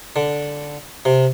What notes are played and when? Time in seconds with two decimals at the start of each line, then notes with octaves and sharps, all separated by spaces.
0.16 D3
1.05 C3